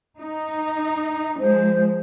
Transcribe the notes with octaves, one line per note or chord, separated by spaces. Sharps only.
D#4
F3 G#3 C5